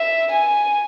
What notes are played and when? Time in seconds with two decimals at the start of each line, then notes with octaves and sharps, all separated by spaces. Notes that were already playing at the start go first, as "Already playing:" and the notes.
Already playing: E5
0.32 G#5